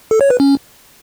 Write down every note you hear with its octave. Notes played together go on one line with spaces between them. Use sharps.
A4
C#5
B4
C#4